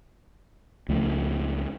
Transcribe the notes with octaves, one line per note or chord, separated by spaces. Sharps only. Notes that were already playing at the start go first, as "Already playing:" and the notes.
C#2 F3 A3